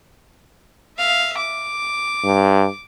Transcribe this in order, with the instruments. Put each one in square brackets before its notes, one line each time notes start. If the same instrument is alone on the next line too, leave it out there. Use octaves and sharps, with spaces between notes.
[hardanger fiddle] E5 F5
D6
[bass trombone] G2